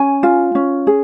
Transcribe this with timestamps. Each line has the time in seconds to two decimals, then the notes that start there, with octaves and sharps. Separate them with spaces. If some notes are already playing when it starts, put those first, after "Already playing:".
Already playing: C#4 G#5
0.23 F4
0.55 C#4
0.87 G#4